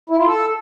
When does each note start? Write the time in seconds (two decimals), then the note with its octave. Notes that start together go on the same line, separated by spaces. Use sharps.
0.10 E4
0.18 F4
0.27 A4